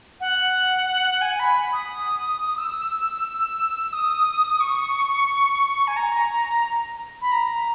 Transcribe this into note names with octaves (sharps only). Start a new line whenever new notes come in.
F#5
G#5
B5
D#6
E6
D#6
C#6
G#5
A#5
B5
A#5